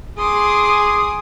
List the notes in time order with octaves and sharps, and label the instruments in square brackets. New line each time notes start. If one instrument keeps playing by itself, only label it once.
[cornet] G#4 [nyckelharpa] C6 D6 [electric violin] D#6